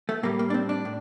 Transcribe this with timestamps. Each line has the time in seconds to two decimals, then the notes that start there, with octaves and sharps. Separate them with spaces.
0.09 A3
0.23 A2 G3 A#3
0.39 A#3
0.50 D4
0.54 C4
0.69 D4
0.85 A2